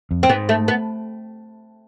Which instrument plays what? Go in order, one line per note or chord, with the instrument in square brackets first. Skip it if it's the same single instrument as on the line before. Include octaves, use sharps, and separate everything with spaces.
[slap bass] F2
[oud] C4
[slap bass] G#2 [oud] B3
[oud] A3
B3